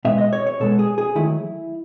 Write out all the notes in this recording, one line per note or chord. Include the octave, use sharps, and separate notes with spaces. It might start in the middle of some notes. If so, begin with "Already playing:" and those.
B2 G#3 B3 E5
D#5
C#5
C#5
B2 G#3 B3 A4
G#4
G#4
D#3 F#3 A3 E4